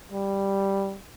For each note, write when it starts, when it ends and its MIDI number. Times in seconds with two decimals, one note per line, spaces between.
0.12 0.98 55